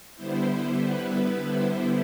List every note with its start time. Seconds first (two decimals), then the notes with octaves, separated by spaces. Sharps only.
0.16 D3 G3 B3 E4 C5
0.83 B4
1.48 C5